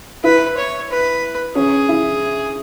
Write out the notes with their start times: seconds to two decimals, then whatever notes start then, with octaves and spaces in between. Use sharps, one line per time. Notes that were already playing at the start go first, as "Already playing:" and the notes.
0.24 E4 B4
0.57 C#5
0.90 B4
1.55 C#4 G#4
1.89 E4